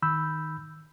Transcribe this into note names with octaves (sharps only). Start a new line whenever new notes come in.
D#3 B5 E6 G6